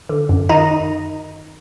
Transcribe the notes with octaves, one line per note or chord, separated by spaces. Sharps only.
D3
F#2
D#3 D#4 D#5